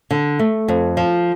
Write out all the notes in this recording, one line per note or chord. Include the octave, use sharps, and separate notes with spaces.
D3
A3
F2
F3